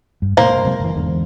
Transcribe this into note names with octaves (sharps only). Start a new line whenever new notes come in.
G2
A2 C3 A#3 C4 C5
G2
C3 F#3 G#3
F#1 E3
E2 G#2 D3